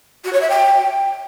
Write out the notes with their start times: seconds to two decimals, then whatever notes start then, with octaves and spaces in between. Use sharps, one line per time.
0.24 F#4
0.33 C#5
0.41 E5
0.49 G5